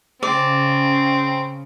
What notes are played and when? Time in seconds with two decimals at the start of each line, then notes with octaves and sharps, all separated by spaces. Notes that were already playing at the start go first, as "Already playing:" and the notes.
0.23 C#3 C4 D5